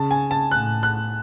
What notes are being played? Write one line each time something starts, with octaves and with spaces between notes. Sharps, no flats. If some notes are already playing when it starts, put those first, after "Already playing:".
Already playing: C#3 A5
G#5
A5
A2 F#6
F#6